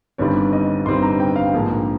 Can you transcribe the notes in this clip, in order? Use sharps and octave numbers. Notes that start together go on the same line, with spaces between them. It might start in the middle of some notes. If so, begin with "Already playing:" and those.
G1 G2 D#3 G3 C4 C#5
D#5
G1 G2 D#3 G3 C4 C6
A#5
G5
F5
A#1 G#2 F3 A#3